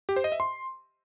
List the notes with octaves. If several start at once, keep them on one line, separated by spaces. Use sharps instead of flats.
G4
C5
D#5
E5
C6